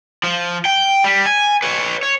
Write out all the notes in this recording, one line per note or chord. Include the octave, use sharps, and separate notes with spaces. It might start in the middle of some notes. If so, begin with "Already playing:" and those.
F3
G5
G3
G#5
B4 C#5
C#5